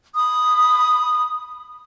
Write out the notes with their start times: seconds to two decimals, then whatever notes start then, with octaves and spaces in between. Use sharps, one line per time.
0.14 B5 D#6